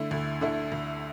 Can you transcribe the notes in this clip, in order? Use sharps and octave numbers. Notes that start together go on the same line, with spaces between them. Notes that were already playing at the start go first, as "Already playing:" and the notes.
Already playing: D3 A3 E4
D2
D3 A3 E4
D2